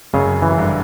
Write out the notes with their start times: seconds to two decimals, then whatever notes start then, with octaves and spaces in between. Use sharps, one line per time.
0.13 F#1 F#2 C#3
0.42 E3
0.58 G1 G2